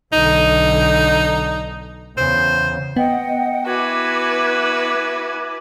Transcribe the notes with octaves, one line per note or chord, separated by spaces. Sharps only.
B1 D3 D#4
E2 C#3 C5
B3 D#5 F#5 G5
E4 F#4 B4 G#5 D6 G#6